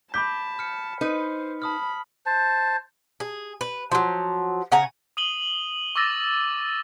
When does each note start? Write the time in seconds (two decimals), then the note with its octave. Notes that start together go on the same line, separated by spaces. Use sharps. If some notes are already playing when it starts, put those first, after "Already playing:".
0.14 A5 B5 D6 G6 B6
0.59 F6 C#7
1.01 D#4 B4 C5
1.62 A5 B5 D#6 F6
2.26 C5 A5
3.20 G#4
3.61 B4
3.92 F3 F#3
4.72 C#3 F#5 G#5 A#5
5.17 D#6 D#7 F#7 G7
5.95 C#6 D6 E6 A6 A#6